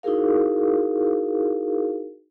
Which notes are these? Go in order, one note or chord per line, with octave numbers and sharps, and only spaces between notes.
D#4 E4 F#4 G#4 A#4 F5